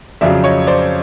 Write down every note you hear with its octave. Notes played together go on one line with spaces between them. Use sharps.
F2 C#3 F#3 D5 E5
C#5 D#5
C5 D5